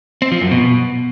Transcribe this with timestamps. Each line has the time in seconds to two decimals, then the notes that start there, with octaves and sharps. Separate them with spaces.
0.22 C4
0.32 F3
0.41 F#2
0.51 B2